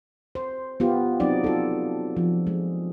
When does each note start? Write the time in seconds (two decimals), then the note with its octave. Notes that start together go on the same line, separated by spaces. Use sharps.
0.35 C5
0.80 B3 F4 G4
1.20 F#3 C4 D#4 D5
1.44 F4 A4
2.17 F3
2.47 G#3